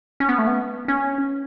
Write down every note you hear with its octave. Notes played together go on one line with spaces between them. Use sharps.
C#4
B3
A3
B3
C#4